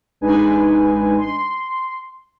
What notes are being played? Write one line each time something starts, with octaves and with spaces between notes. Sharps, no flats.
A1 G#3 D4 D#4 B4 G#5
C6